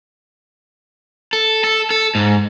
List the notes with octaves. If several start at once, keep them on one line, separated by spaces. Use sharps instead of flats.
A4
A4
A4
G#2